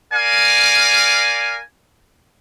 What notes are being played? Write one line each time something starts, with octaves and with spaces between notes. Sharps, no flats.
A#4 D5 F5 G#5